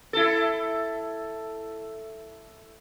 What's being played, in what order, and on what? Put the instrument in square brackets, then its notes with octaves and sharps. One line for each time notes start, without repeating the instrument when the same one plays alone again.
[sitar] E4 A4